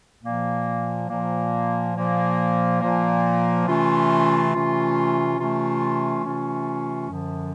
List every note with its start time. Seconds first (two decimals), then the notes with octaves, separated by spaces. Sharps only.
0.23 A#2 F3 A#3
1.09 A#2 F3 A#3
1.95 A#2 F3 A#3
2.80 A#2 F3 A#3
3.66 C3 E3 A3 C#4 F4
4.53 C3 E3 A3 C#4 F4
5.39 C3 E3 A3 C#4 F4
6.25 C3 E3 A3 C#4 F4
7.11 F#2 D3 F3